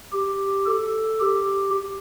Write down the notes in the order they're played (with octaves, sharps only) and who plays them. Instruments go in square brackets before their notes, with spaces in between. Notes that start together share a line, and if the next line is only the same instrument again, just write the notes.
[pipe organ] G4
A4
G4